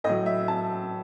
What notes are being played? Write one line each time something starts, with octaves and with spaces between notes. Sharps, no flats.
A2 F#3 D#5
E5
A5